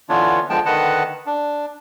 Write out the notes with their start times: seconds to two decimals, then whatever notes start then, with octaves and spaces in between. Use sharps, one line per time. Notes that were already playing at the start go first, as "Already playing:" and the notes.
0.09 D3 E3 B3 D4 F4 C#5
0.50 D3 F3 G#3 B3 G5 A5
0.66 D3 D#3 B4 D#5 F#5 A5
1.26 D4